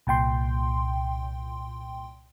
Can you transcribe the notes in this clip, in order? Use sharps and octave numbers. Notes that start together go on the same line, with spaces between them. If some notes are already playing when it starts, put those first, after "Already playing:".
C2 A#2 G5 C6